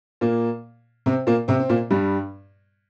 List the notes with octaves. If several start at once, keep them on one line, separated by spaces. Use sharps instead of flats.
A#2 A#3
C3 C4
A#2 A#3
C3 C4
C4
A#2 A#3
G2 G3